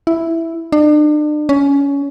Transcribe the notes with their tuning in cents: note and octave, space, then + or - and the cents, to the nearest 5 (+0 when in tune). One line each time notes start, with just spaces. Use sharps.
E4 +0
D4 +40
C#4 +20